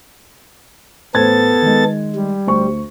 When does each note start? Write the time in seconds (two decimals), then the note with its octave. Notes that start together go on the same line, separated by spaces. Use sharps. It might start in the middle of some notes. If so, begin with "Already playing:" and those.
1.14 A1 B3 A4 C5 G#6 A6
1.62 D#3 G#3
2.15 G3
2.47 D2 C5 C#6